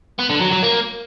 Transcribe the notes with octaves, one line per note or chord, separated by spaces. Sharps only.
B3
D3
F#3
F#3
A#3